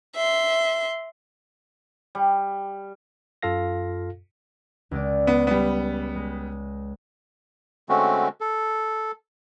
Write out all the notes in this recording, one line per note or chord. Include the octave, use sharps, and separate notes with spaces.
E5 C6
G3
F#2 F4 A4 F5 A#6
C#2 G#3 D5
B3
G3 B3
G#3
D3 G#3 A3 C4 C#4 F#4
A4